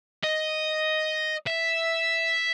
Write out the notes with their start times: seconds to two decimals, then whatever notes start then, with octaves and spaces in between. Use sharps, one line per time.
0.24 D#5
1.47 E5